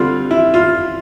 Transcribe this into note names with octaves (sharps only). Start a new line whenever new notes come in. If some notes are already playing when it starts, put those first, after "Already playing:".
Already playing: D3 G3 C4 F4
E4
F4